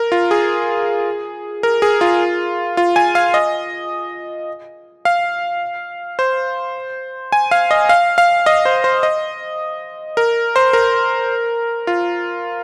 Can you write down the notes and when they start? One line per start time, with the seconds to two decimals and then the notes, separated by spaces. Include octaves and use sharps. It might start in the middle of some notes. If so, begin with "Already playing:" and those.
Already playing: A#4
0.12 F4
0.31 G#4
1.63 A#4
1.82 G#4
2.01 F4
2.77 F4
2.96 G#5
3.15 F5
3.34 D#5
5.05 F5
6.19 C5
7.32 G#5
7.51 F5
7.71 D#5
7.89 F5
8.18 F5
8.46 D#5
8.65 C5
8.84 C5
9.03 D#5
10.17 A#4
10.56 C5
10.73 A#4
11.87 F4